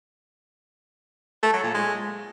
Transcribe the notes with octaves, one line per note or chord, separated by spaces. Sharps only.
A3
F#3
A#2
G#3